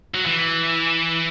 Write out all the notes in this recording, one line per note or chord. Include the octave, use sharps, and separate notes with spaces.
F#3
E3